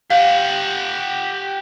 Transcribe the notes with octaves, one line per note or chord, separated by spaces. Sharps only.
G4 F5 F#5